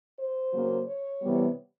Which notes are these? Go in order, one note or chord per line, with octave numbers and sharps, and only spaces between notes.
C5
C#3 F#3 A#3
C#5
C3 E3 G3 B3